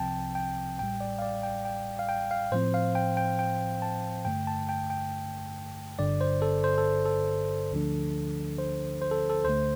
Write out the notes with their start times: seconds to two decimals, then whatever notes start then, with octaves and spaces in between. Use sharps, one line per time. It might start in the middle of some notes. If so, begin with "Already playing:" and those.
Already playing: C2 C3 F3 C4 G5 A5
0.35 G5
0.79 A1 A2 G3 G5
1.01 D5
1.19 F5
1.22 D5
1.43 G5
1.65 G5
1.99 F5
2.09 G5
2.31 F5
2.52 A2 F3 C4 C5
2.74 F5
2.95 G5
3.17 G5
3.39 G5
3.82 A5
4.25 G2 D3 A3 G5
4.47 A5
4.69 G5
4.90 G5
5.99 G1 G2 D3 D5
6.21 C5
6.42 A4
6.64 C5
6.78 A4
7.06 A4
7.71 D2 D3 F3 A3 D4
8.58 C5
9.02 C5
9.11 A4
9.29 A4
9.45 D2 D3 A3 C5